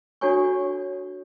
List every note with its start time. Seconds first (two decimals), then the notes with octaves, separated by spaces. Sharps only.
0.21 D4 F#4 A4 C#5 G#5 C#6